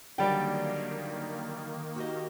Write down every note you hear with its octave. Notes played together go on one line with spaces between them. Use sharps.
D3 D#3 F#3 G3 A#3 D5 G5
F#4 G4 D#5